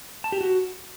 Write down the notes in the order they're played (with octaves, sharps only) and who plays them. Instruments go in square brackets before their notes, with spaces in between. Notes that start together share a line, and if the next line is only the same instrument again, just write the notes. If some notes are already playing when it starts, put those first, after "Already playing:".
[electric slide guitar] A5
G4
F#4